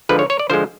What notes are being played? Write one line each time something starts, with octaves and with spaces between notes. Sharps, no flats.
D3 F3 G#3 B4
C#5
C#5
D5
D3 F3 G#3 C5